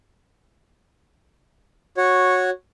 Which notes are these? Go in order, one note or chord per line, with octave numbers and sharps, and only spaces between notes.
F#4 C#5